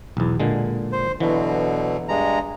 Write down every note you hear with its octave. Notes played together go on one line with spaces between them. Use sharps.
B1 E2
A#2 D3 G#3
C5
B2 D3 E3 F#3
G2 G#3 A#5